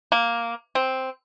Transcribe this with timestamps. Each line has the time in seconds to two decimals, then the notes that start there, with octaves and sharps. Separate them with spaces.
0.12 A#3
0.75 C4